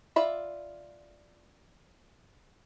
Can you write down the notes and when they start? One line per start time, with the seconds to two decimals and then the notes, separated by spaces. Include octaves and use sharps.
0.16 F4 D5 E5 B5